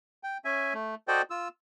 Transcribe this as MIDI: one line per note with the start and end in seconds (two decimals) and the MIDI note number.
0.23 0.38 79
0.45 0.73 61
0.45 0.73 76
0.45 0.73 80
0.74 0.95 57
1.08 1.22 66
1.08 1.22 69
1.08 1.22 72
1.08 1.22 74
1.08 1.22 75
1.08 1.22 79
1.30 1.48 65
1.30 1.48 88